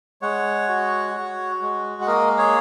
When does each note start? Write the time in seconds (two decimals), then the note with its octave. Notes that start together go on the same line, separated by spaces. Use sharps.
0.22 G#3 C#5 F#5
0.68 F#4
1.14 F#4
1.62 G#3
2.02 F#5
2.07 A#3 A#4 D#5
2.38 G#4 C#5